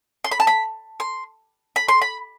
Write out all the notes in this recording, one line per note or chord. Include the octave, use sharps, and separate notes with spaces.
C6
B5
A5
B5
C6
B5
C6
B5